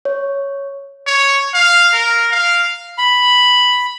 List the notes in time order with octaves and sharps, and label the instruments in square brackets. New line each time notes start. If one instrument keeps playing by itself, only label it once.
[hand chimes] C#5
[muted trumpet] C#5
F5
A#4
F5
[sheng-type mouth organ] B5